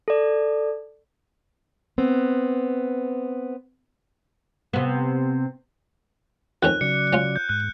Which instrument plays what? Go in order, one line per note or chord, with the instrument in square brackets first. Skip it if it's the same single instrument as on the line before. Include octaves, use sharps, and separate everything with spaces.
[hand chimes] A4 D5
[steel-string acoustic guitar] B3 C4
[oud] C3 B3
[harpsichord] F2 D#3 C#4 [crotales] F#6
[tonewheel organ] C#3 F#3 D5 [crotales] C#7
[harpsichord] C#4 F4
[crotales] G6
[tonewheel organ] G#2 [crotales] F#6